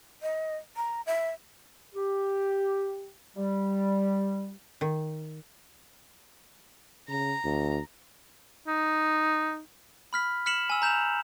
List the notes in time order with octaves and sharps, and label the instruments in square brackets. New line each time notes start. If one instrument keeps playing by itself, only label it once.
[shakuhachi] D#5
A#5
E5
[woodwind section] G4
G3
[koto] D#3
[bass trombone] C#3 [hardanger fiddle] A#5
[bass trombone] D2
[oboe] D#4
[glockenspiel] B5 F6 B6
F6 B6 C#7 E7 F#7
G#5 E6
A#5 G6 E7 F7